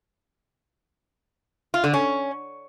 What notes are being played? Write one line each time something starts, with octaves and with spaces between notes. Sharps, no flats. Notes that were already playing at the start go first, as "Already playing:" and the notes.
F4
D3
C#4